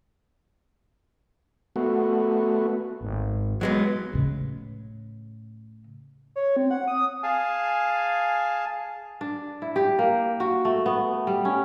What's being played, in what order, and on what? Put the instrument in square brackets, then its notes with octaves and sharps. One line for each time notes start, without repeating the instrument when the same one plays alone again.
[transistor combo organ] A3 B3 F#4
[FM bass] G#1
[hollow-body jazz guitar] F#3 G#3 B3
[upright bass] A2 C#3
[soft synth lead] C#5
C4
F#5
D#6
[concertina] G#4 F5 G#5 A5
[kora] D4
E4
G4
A#3
F#4
A3
B3
G3
C#4